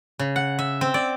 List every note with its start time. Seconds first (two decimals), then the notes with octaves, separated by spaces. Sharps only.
0.19 C#3
0.36 F#5
0.59 E5
0.81 C4
0.94 D5